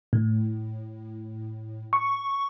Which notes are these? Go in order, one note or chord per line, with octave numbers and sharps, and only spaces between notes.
A2
C#6